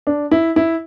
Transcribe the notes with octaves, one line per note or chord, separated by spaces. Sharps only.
D4
E4
E4